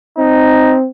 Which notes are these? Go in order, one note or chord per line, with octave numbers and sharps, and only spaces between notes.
C4 D#4